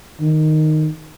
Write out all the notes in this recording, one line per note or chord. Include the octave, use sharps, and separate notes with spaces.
D#3